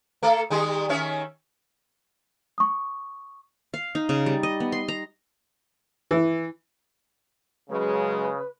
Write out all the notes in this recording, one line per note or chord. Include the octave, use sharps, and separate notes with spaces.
A3 A4
D#3 G3 G#3
D#3 C#4 E5
C#6 D#6
F5
D#4
C#3
G3
D#5
B3
C6
A#5
E3
C#3 F#3 G#3 B4